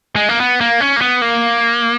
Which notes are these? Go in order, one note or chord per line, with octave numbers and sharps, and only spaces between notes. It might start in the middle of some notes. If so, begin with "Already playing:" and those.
G#3
A#3
B3
A#3
C#4
A#3
B3
A#3